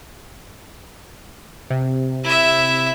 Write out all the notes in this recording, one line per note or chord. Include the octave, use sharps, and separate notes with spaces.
C3
E4 E5